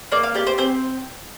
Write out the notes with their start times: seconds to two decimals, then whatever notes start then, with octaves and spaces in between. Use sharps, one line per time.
0.12 A#3 D5
0.23 F5
0.35 G4 D5
0.47 C5
0.58 C4 C5